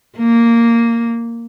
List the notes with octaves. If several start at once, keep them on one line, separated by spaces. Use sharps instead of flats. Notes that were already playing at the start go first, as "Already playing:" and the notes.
A#3